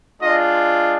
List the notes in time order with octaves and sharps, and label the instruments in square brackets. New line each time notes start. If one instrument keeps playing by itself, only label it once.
[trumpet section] G#3 D4 F4 D#5